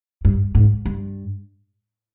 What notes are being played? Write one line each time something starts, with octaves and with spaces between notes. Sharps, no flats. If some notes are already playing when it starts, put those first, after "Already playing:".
G2
G#2
G2